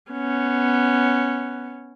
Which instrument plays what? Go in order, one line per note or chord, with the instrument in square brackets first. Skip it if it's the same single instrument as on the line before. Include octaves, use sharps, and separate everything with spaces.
[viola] B3 C#4